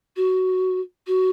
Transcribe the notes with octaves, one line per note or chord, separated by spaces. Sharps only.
F#4
F#4